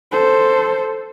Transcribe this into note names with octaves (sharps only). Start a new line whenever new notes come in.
A4 C5